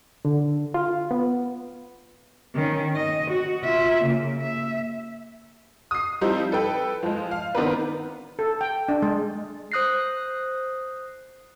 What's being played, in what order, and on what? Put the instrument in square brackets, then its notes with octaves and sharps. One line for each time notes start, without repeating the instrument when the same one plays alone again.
[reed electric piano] D3
F4
B3
[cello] D#3 C#4
D#5
F#4
F4 E5
C#3 A#3
E5
[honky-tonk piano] D#6 C7
F3 G3 C4 D#4 E4
A4 B4 G5
F3 G#3
F5
D#3 B3 C4 D4 A#4 B4
[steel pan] A4
G5
D4
G#3
[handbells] C5 D#6 F#6 A#6 C7